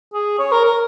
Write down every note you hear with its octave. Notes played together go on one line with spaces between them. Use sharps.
G#4
C#5
A#4
A#4